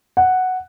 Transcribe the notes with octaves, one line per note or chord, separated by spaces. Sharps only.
F#5